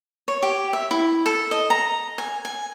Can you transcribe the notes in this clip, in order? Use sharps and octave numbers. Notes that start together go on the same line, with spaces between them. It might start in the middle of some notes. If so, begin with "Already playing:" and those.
C#5
G4
E5
E4
A4
D#5
A#5
G#5
G#5